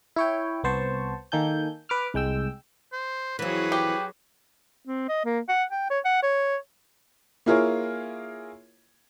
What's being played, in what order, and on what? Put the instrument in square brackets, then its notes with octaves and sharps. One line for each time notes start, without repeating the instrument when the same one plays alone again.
[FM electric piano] E4 C#5 G5
C2 B3 C5 A5 C#6
D#3 A#3 A4 G#5 G6
B4 D6 F6
C2 G#3 G5 E6
[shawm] C5
[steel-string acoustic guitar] F2 E3 [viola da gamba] F#3 F#4 G#4 [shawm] B4
[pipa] G4
[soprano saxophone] C4
D#5
A#3
F#5
G5
C#5
F#5
C#5
[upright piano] A#3 E4 F4 G#4 A#4 C#5